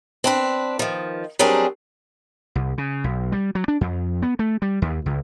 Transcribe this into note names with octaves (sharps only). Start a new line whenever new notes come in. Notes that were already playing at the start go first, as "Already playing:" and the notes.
C4 D4 B4
D#3 F3
F#3 G3 C4 D4 G#4 A#4
C2
C#3
B1
G3
F#3
D4
F2
B3
A3
G3
D#2
C#2